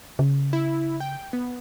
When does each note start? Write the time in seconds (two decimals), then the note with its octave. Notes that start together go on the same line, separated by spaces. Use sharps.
0.19 C#3
0.53 E4
1.00 G5
1.33 B3